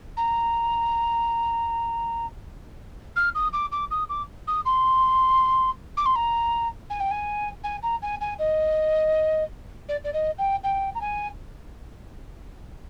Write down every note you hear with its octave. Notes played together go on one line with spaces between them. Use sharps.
A#5
F6
D#6
D6
D6
D#6
D6
D#6
C6
D6
C6
A#5
G#5
G5
G#5
G#5
A#5
G#5
G#5
D#5
D5
D5
D#5
G5
G5
A#5
G#5